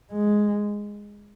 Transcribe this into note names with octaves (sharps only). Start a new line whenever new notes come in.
G#3